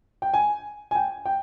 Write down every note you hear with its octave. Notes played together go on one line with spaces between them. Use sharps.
G5
G#5
G#5
G5
G5